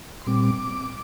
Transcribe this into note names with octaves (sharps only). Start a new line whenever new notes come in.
C6
A#2 G3 C4 D6